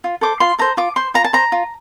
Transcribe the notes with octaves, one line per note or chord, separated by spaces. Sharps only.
F4
A4 C5 D6
F4 C6
A4 C5 A#5
F4 D6
C5 C6
F4 A#5
A5
C5 A#5
F4